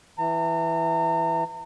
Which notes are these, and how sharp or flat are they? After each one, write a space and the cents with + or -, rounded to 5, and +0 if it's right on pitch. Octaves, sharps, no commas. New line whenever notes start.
E3 +0 A#5 -40